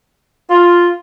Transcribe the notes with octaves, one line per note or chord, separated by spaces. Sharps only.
F4